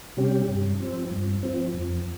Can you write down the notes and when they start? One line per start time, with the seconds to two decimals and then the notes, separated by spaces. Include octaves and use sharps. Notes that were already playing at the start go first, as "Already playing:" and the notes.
0.17 C3 G3 C#4 G4
0.49 G2
0.80 F3 C4
1.11 G2
1.43 F3 C4
1.74 F2